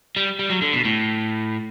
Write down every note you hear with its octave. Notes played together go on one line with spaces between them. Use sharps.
G3
G3
F#3
D3
B2
A2